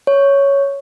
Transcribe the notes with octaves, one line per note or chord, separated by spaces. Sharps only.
C#5